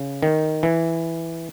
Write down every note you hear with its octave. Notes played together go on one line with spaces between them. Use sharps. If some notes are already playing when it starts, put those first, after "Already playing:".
Already playing: C#3
D#3
E3